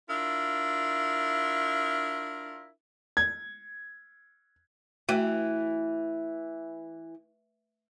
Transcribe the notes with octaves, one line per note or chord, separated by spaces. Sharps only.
D4 E4 F4 A#4
G#6
E3 A3 F#4 G5